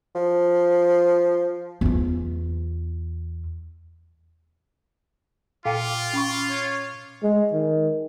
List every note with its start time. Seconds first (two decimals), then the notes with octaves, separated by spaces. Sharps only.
0.15 F3
1.81 E2 F4
5.65 A#2 F4 F5 G5 A5 D6
6.13 C#4 B5 C#6
6.50 C#5
7.23 G#3
7.53 D#3